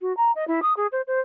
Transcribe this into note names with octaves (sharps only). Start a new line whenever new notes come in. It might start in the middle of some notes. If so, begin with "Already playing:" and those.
F#4
A#5
D#5
E4
D#6
G#4
C5
C5